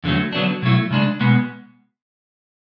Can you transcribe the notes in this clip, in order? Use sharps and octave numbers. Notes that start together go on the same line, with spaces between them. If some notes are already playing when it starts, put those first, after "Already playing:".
E2 D3 F#3 A3
D3 F#3 B3 D4
B2 F#3 A3 E4
C#3 G#3 D4
B2 G#3 B3